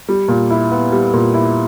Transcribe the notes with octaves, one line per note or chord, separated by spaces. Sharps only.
G3
A#2
E4
B3
G3
A#2
E4